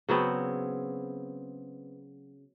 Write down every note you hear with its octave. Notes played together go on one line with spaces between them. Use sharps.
C#3 F#3 B3 C4